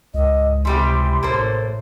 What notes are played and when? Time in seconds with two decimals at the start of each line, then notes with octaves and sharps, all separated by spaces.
0.14 C#2 G#2 D#5
0.65 C3 E3 G3 G4 C6
1.23 A1 A2 A#3 A4 C5